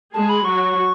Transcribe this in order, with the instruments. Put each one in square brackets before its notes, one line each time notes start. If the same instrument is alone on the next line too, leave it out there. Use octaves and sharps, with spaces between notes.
[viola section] G#3 G#4 [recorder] A5
[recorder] B5
[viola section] F#3 F#4 [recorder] C#6